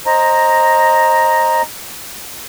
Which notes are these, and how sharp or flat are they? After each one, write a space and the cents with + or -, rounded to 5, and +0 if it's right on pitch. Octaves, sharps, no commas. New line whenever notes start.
C5 +20 D#5 +0 A#5 +0